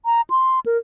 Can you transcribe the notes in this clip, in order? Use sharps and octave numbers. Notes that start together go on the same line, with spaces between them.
A#5
C6
A#4